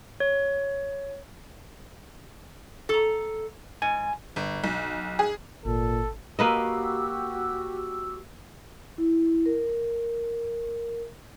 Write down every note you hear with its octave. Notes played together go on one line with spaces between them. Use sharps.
C#5
A4 A#5
G#2 G#5
G1
B1
G#4
G#1 A#2 A4
A#3 F#4 G4 B4 D#5 E6
E4
A#4